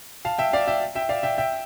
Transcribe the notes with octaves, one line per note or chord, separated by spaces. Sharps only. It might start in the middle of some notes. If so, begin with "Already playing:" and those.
F5 A5
E5 G5
D5 F5
E5 G5
E5 G5
D5 F5
E5 G5
E5 G5